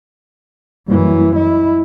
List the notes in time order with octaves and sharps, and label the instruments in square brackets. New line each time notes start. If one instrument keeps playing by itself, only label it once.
[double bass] F#2 E3 [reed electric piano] G3 A#3 E4
[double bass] E4 [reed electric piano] D#5